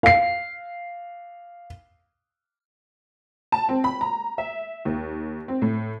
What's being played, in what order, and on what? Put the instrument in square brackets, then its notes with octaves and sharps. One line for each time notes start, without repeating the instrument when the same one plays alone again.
[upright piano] F5 C7
[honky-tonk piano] A5
C4
B5
A#5
E5
D#2
C4
A2